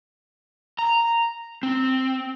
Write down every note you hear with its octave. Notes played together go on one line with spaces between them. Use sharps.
A#5
C4